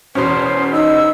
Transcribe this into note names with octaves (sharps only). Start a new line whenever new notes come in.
E2 B2 C#4 C5
D#4 E6